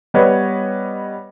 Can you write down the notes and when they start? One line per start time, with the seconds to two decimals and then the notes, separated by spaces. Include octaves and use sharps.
0.14 G3 B3 B4 C#5 D#5